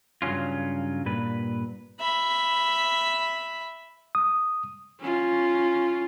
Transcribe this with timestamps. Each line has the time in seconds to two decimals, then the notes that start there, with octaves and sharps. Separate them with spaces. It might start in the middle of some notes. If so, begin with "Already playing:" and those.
0.22 G2 C#3 F#3 C#4 F4
1.06 G2 A#2 B4
2.00 E5 B5
4.15 D#6
5.00 C#4 F4